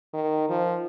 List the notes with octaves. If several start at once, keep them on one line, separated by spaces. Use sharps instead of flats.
D#3
F3